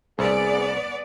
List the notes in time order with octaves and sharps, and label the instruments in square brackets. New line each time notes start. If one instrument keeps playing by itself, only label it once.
[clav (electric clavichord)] C2 [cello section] B3 D5 [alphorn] G#4